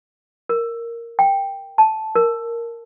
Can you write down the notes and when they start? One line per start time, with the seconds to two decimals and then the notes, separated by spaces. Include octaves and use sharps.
0.49 A#4
1.19 G5
1.78 A5
2.15 A#4